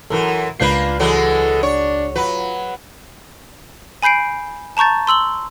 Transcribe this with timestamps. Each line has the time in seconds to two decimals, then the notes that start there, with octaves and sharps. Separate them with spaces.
0.10 F#2 E3 A4 A#4
0.60 C#2 A#3 D4 F4 B4 G6 C7
0.99 E3 F#3 G#3 A4
1.63 D4 C#5
2.15 F#3 F4 B4
4.02 G#5 B5 G6 C7 D7
4.77 A5 A#5 C#6 G6 A6
5.07 C6 E6 F#7 G7